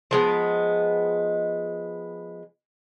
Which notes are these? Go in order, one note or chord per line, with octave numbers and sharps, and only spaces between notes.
F3 G#3 B3